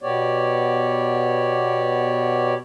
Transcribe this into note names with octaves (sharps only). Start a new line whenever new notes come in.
B2 B3 G4 C#5 D5